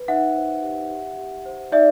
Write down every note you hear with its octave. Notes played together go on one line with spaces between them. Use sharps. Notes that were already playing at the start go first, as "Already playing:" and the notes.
Already playing: B4
D#4 E5 F#5
C5
G4
G4
G4
C5
D#4 D5 E5